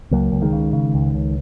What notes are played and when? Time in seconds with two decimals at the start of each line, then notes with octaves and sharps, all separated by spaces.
0.11 C#2 F#3 A#3
0.32 C#2
0.42 D#3 G#3
0.53 C#3
0.73 C#3
0.94 C#2
1.14 C#2